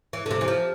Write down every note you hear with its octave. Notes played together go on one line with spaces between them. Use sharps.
E3
D3
C3
E3
F3